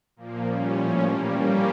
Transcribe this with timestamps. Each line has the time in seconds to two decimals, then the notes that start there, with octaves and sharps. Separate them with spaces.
0.16 A#2 F3 A#3
0.46 A#2 G3 C#4
0.74 A2 F3 C#4 E4
1.03 G2 E3 G3 A#3
1.32 E3 G3 A#3 C#4 G4